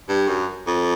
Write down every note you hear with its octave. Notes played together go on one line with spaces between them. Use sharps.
G2
F#2
F2